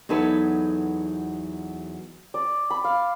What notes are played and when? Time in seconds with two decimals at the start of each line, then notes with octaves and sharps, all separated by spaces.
0.09 E2 F#3 D#4 A4 B4
2.34 D5
2.70 B5
2.84 F5